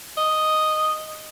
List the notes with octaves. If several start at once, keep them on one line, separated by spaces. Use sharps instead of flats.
D#5